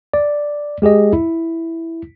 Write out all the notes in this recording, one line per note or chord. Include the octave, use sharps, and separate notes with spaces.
D5
G#3 G4 G#4 D#5
E4